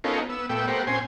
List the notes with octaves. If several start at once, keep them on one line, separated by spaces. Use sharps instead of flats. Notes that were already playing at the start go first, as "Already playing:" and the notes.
B3 C#4 D#4 F4 A4 A#4
B3 E6
A#2 A3 B3 G5 E6
A3 B3 G4 A#4 C5 F#5
A#2 C4 C#4 G#5 C6